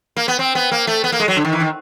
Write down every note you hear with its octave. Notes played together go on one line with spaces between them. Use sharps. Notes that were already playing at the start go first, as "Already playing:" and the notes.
A#3
B3
C4
B3
A#3
A3
B3
A#3
G#3
F#3
D3
D#3
E3
D#3